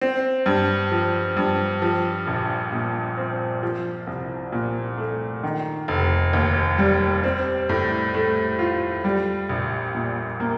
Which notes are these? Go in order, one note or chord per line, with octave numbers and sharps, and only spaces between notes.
C4
G2
F3
G2
F3
A#1
A#2
C4
F3
C2
A#2
A3
D#3
F1
D#2
G3
C4
A2
A3
F4
G3
A#1
A#2
A#3